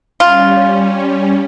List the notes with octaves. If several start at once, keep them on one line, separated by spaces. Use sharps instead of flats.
G3 C#4 F4